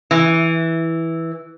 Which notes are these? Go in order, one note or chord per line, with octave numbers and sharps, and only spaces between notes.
E3